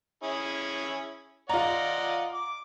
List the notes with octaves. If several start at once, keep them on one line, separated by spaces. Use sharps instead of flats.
C#4 E4 G#4
F4 D5 D#5 F#5 A#5
D6